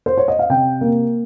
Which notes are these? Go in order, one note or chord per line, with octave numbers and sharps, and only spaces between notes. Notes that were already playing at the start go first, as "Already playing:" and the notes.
C5
C#5
D#5
F5
C3 G5
A#3